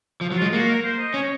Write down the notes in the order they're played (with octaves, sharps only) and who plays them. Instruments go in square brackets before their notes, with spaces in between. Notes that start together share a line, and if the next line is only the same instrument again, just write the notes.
[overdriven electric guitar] F3
F#3
[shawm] F4
[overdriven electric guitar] G#3
[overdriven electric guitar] A#3 [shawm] F#4
[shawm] A#4
C5
D#5
[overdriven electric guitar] C#4 [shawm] C#5